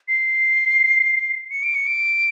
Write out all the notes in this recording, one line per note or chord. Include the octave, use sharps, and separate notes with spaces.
C7
C#7
D7
C#7
D7